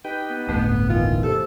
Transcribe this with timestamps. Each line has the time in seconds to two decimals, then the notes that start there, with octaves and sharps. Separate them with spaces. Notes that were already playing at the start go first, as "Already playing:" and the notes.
0.05 D#4 G4 B4 G5
0.30 B3
0.49 D1 G1 A3 B3 G6
0.90 B2 D#3 E3 F4
1.23 G4 A4 C5